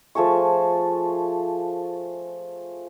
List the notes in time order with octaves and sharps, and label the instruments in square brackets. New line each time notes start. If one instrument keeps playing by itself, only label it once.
[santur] F3 A3 G#4 C#6